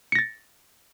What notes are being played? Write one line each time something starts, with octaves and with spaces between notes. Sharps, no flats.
A6 A#6 C#7